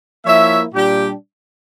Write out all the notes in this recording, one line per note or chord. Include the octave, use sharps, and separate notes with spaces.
F3 A#3 E4 C#5 E5
A#2 G3 D4 G4